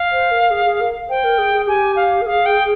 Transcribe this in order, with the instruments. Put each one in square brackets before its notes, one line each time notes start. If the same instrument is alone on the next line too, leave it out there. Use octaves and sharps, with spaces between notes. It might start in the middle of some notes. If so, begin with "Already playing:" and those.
Already playing: [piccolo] F5
[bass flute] C5
A#4
G#4
G#4
A#4
[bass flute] C5 [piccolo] G5
[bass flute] A#4
G#4
G#4
[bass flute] G4 [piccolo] G#5
[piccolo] F5
[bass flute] A#4
[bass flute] G#4 [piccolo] F5
[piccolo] G5